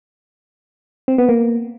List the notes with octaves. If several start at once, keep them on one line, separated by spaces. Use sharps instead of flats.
C4
B3
A#3